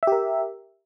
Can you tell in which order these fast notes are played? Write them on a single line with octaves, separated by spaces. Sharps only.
E5 G4 A#4